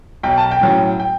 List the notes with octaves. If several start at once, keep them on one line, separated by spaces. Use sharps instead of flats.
B1 G5
A5
G5
A2 F#3 C#4
G5